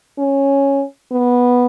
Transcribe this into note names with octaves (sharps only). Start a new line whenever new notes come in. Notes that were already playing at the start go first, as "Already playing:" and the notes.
C#4
B3